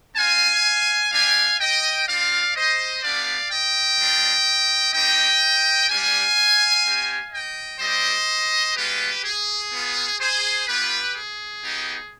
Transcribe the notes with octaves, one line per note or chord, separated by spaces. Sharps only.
C4 F4 F5 G#5
G3 D4 G4 F5 G#5
D#5 G5
C4 F4 D5 F5
C5 D#5
B3 D4 G4 D5 F5
D#5 G5
G3 D4 F4
C4 D#4 G4 D#5 G5
G3 D4 G4 F5 G#5
C4 G4
D#5 G5
G3 C4 G4 C5 D#5
G#3 B3 F4 G4 B4
G#4
B3 F4
G#4 C5
B3 F4 G4 B4
G#4
B3 D#4 G4